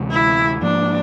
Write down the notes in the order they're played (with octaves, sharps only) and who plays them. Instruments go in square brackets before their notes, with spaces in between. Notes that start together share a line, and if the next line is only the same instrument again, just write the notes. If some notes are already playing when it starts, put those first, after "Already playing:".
Already playing: [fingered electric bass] D2 C3 E3 G#3
[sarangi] E4
[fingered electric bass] G#2 F3 A#3 [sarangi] D4